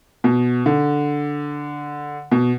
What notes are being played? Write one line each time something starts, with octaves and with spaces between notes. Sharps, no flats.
B2
D3
B2